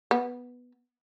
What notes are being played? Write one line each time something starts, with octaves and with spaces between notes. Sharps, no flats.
B3